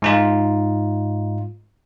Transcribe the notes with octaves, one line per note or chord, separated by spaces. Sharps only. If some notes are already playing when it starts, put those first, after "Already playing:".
G#2 D#4 F4